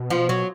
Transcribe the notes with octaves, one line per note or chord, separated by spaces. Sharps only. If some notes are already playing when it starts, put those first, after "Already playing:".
Already playing: B2
F3
F#3